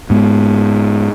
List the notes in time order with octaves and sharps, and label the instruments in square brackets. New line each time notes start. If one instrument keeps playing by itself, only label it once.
[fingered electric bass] G#2 G#3 B3